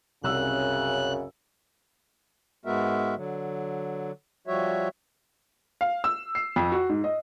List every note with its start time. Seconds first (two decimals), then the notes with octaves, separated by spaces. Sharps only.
0.24 C2 F#2 C#3 E6 F#6
2.65 G#2 G#3 B3 F#4 A#4 E5
3.16 D3 F#3
4.47 F3 G3 F#4 C#5 E5
5.81 F5
6.04 E6
6.35 C7
6.56 F2
6.72 F#4
6.89 G#2
7.04 D#5